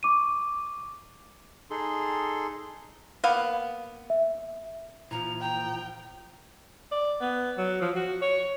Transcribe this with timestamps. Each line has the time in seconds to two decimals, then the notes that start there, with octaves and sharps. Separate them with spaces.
0.03 C#6 D6 D#7
1.70 D#4 G#4 A4 C6
3.24 A#3 B3 F5
4.10 E5
5.11 A#2 E3 F3 A#5
5.41 G5 A#5
6.92 D5
7.21 B3
7.58 F#3
7.81 F3
7.95 F#4
8.21 C#5